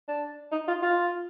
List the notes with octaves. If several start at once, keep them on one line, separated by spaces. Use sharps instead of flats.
D4
D#4
F4
F4